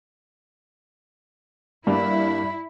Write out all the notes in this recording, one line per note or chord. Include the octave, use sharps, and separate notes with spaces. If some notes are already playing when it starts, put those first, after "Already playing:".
G2 A#3 D4 E4 G4 B5